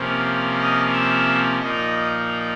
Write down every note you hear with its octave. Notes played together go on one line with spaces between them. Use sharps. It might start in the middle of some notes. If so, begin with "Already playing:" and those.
Already playing: C3 F3 A#3 C#4
D#5
E5
A#2 F3 A#3 D#4 D#5